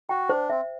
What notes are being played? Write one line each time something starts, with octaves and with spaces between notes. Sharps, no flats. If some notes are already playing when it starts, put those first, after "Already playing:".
F#4 G5
D4 C5
C4 E5